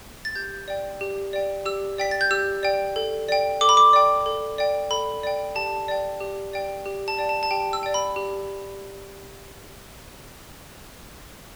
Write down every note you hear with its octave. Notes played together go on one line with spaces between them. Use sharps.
A6
G4 G6
D5 G5
G4
D5 G5
G4 E6
D5 G5 B6
A6
G6
G4 E6
D5 G5
A4
D5 G5
A4 D6
B5
D6
D5 G5
A4
D5 G5
A4 B5
D5 G5
G4 A5
D5 G5
G4
D5 G5
G4
A5
D5 G5
A5
A5
G4 G5
E6
D5 G5
B5
G4